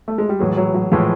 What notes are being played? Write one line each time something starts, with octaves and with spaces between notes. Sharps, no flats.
A3
G#3
G3
A2 E3 F#3 G#3
F#3
F#3
A2 E3 F3 G#3